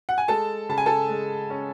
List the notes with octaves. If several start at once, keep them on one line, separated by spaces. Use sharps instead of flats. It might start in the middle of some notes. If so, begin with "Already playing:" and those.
F#5
G#5
G#3 A4 A5
C#3 A5
G#5
A4 A5
G#3
C#4